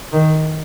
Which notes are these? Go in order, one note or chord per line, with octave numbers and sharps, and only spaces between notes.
D#3